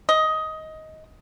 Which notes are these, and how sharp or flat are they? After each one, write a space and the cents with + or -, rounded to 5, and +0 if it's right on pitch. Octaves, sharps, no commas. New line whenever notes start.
D#5 +15